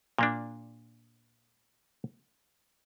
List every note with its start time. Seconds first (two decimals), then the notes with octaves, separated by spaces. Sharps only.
0.19 A#2 A#3 D4